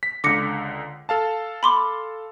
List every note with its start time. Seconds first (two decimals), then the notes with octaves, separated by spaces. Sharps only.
0.03 B6
0.24 C#2 D3 D6 A#6 C#7
1.09 A4 F5 A5
1.63 B5 C6 D6